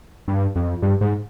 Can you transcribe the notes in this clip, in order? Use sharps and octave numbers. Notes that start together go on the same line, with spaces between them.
G2
F2
G2
G#2